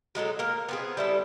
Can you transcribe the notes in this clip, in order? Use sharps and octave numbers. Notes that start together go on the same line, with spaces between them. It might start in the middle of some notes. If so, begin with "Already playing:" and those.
F#3 G#3 D#4 A4
A#3 A#4
B3 C4 G#4
G3 E4 A4